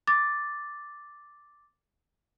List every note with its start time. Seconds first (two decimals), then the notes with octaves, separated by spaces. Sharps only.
0.07 D6 A6